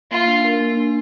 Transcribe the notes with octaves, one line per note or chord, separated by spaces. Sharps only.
A#3 F4
D4
A#4
A#3
D4